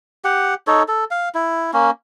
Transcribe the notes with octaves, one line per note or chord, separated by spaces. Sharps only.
G4 F#5
D#4 A4 C#5
A4
F5
E4
A#3 C#4